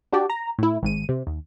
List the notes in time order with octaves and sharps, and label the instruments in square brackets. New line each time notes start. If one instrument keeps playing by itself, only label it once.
[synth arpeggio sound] D4 F#4 G4 D5
A#5
A2 E4
G#1 G#2 D#7
C3
D#2